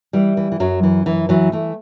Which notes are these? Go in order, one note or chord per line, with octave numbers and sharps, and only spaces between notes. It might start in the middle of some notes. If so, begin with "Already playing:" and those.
E3 G3
E3
E3
F#2 F#3
E3
F#2 E3
E3 F#3
E3 A3